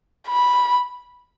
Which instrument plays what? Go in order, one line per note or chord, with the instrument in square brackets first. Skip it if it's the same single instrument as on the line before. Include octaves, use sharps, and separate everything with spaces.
[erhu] B5